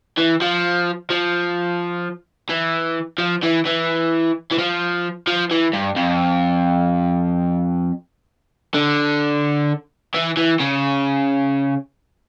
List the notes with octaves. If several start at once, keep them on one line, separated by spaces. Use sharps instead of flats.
E3
F3
F3
E3
F3
E3
E3
E3
F3
F3
E3
G2
F2
D3
E3
E3
C#3